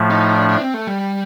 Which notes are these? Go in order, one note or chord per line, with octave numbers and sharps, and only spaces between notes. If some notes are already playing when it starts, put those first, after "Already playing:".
Already playing: A2 F3 A3
D#4
D4
D4
C4
A3
G3